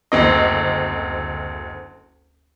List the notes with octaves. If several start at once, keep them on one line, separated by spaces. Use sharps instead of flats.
F#1 D2 C4 D#5